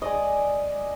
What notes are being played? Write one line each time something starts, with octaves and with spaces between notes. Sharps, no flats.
G#3 D5 D#5